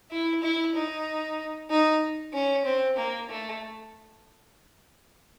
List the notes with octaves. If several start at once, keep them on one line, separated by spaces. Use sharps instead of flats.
E4
E4
D#4
D#4
C#4
C4
A#3
A3